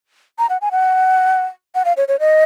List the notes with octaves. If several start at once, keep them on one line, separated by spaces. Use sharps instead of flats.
A#5
F#5
G#5
F#5
F#5
F5
C#5
C#5
D#5